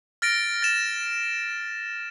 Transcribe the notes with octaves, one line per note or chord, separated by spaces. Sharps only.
F6 A6 A#6 D7
A6 E7